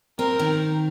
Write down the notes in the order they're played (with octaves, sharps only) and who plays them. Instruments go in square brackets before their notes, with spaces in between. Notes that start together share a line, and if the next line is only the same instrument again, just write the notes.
[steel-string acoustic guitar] C4 [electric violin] A#4
[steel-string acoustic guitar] D#3